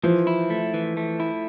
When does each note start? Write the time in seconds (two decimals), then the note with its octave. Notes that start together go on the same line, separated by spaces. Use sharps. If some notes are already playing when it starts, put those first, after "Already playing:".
0.03 E3 F3
0.27 E4
0.50 A3
0.74 E3
0.97 A3
1.20 E4